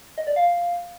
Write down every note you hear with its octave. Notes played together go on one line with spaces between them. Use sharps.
D#5
D5
F5